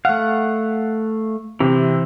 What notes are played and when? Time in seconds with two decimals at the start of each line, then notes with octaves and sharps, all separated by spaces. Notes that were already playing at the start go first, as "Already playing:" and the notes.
0.05 A3 F5 F#5
1.60 C3 E3 C4